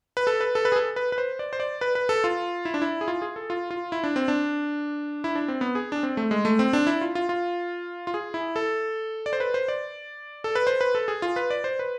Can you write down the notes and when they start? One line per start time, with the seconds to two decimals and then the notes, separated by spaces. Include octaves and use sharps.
0.17 B4
0.27 A4
0.41 B4
0.55 A4
0.65 B4
0.72 G#4
0.76 A4
0.96 B4
1.12 B4
1.18 C5
1.39 D5
1.53 C5
1.60 D5
1.81 B4
1.95 B4
2.09 A4
2.24 F4
2.65 E4
2.74 D4
2.82 E4
3.01 G#4
3.08 F4
3.22 G#4
3.36 A4
3.50 F4
3.71 F4
3.92 E4
4.04 D4
4.16 C4
4.28 D4
5.24 E4
5.35 D4
5.48 C4
5.61 B3
5.75 G#4
5.92 D4
6.03 C4
6.17 A3
6.31 G#3
6.45 A3
6.59 C4
6.73 D4
6.87 E4
7.01 F4
7.15 F4
7.29 F4
8.07 F4
8.14 G#4
8.34 E4
8.56 A4
9.26 D5
9.33 C5
9.40 B4
9.54 C5
9.68 D5
10.44 A4
10.55 B4
10.67 C5
10.81 B4
10.95 A4
11.08 G#4
11.22 F4
11.36 B4
11.50 D5
11.64 C5
11.79 B4